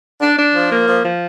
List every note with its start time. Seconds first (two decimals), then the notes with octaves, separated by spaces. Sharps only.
0.21 D4
0.38 D4
0.55 F3
0.71 A#3
0.88 F3
1.04 F3